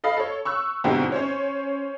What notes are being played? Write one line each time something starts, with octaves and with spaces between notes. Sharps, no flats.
A4 D#5 F5 B5
A4 C#5
C#6 E6 F#6
G#2 B2 D3 C4 E4 G4
C#4 C5 C#5